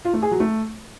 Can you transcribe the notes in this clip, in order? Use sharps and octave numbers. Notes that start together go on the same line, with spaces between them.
F4
A3
G#4
F#3
A3